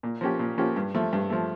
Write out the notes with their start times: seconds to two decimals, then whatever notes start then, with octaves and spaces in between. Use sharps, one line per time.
0.03 A#2
0.21 F3 A#3 C#4 G4
0.39 A#2
0.58 F3 A#3 C#4 G4
0.76 G2
0.94 F3 A3
1.13 G2
1.30 F3 A3